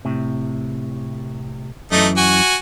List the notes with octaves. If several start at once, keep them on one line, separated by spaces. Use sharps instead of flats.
A2 C3
F#2 E3 A3 D#4 D#5
F#4 G#5